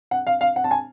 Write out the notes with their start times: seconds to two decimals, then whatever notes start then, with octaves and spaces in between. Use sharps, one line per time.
0.11 F#5
0.27 F5
0.41 F5
0.56 F#5
0.64 A5
0.71 G#5